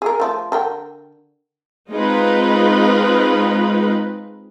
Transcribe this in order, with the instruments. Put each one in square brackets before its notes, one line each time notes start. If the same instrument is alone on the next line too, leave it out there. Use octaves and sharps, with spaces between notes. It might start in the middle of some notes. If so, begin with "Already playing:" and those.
[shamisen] G#4 A#4
F3 A3
D3 A#4 G5
[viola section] G#3 C4 D#4 F4 B4 D#5